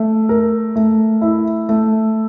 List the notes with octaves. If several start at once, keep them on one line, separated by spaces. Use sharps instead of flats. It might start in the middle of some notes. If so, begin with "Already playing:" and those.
Already playing: A3
A#4
A3
E4
A3